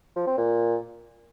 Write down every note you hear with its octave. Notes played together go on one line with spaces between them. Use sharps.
F3
C4
A#2